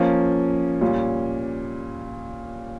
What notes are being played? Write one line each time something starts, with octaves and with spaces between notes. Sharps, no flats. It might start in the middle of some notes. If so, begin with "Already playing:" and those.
Already playing: F3 A#3 C#4
A#2 G3 C#4